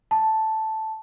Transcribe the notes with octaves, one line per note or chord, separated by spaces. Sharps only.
A5